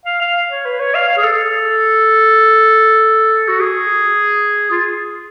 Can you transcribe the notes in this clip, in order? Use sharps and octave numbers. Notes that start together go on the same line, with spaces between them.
F5
F5
C#5
B4
C#5
F5
F5
G#4
A4
F#4
G#4
F4